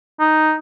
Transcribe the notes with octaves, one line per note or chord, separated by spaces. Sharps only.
D#4